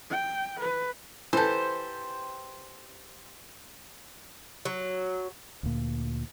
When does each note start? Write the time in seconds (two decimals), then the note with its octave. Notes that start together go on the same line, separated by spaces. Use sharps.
0.10 G5
0.60 B4
1.33 E3 G4 A4 C5
4.65 F#3
5.63 D2 A#2